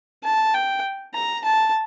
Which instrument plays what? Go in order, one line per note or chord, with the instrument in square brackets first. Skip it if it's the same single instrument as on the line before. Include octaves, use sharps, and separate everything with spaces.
[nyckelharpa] A5
G5
A#5
A5